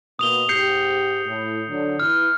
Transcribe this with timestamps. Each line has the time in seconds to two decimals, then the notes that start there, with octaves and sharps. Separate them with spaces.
0.19 B2 A#3 D#6 F7 G7
0.49 G#2 G4 G6 C7 C#7
1.26 A2
1.69 D3 F#3
2.00 E3 E4 F6